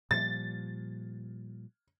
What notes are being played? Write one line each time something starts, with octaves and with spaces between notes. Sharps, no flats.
A#2 F3 G3 A6